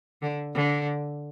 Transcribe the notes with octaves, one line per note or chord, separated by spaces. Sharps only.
D3
D3